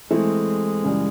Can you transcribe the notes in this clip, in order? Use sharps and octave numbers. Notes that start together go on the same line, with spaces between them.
E3 G#3 A3 C4 E4
F#2 C#3 E3 G3